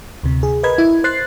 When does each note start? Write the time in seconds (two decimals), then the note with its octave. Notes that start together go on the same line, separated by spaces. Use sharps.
0.23 D2 C3
0.43 G#4
0.63 A#4 B4 D#5 B5 G#6
0.78 E4
1.04 C5 F#6 A6 C7